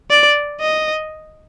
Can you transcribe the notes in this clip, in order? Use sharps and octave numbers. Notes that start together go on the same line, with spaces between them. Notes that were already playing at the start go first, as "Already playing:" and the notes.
D5
D#5